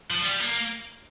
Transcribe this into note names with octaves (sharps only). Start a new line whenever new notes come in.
F3
G3
A#3